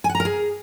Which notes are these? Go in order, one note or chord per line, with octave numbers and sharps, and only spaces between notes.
G#5
F#5
A#5
A#4
G#4